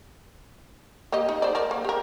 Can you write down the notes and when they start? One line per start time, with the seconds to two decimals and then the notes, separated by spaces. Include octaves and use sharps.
1.12 A#3 G4 D#5
1.29 D#4
1.42 C5 D5
1.55 A#4 D5
1.71 A#3
1.85 G4 A#4